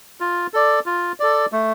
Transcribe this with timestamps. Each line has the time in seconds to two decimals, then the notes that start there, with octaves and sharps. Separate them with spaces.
0.20 F4
0.54 A4 D5
0.86 F4
1.20 A4 D5
1.52 A3